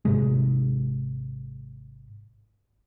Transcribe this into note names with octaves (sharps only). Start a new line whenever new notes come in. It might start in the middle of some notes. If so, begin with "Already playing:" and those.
G#1 G#2 C3 G#3